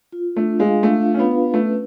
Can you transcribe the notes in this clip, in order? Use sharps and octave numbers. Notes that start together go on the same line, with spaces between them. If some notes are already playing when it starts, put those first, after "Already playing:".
F4
A3 D4
G#3 F5
A3 D4
F4
C#4
B3
B4
A3 C#4